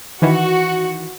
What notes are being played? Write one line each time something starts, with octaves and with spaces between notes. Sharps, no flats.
D#3 E3 F#4